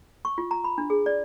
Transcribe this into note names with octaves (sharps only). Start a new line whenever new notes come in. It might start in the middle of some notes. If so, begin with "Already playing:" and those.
C#6
F4
A#5
B5
D4
G#4
D5